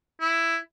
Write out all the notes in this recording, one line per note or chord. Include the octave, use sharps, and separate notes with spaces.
E4